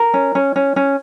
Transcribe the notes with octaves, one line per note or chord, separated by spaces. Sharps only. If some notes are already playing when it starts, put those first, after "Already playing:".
Already playing: A#4
C#4
C#4
C#4
C#4